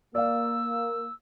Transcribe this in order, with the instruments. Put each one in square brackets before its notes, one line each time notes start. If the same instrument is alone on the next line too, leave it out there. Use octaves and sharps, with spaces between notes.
[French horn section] A#3 [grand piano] D5 F5 [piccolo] E6